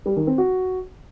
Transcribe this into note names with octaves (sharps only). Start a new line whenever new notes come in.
G3
D#3
C4
F#4